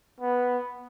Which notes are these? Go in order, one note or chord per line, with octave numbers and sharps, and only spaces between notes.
B3